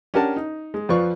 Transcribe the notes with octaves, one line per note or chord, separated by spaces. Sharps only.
C#4 D4 G4 A#4 F#5 A5
D#4
G#3
F2 F3 F4 B4 D5 C#6